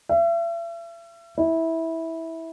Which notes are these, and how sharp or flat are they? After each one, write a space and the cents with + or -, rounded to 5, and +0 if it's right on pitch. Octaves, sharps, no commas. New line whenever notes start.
E5 +40
E4 -15